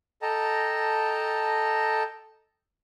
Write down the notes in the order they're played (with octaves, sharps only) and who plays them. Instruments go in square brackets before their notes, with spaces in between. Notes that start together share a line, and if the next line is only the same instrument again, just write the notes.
[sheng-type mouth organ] A4 D#5 G5 A5 A#5